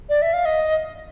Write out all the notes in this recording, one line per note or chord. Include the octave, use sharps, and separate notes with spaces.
D5
E5
F5
D#5